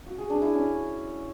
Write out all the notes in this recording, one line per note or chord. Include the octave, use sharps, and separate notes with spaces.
F#4
G#4
D4
E4
C#4